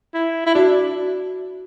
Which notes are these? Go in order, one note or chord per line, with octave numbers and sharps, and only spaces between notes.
E4
E4
D4 F#4